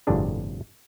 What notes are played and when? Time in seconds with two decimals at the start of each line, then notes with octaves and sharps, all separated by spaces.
0.07 G1 F2 A2 C3 D4 G#4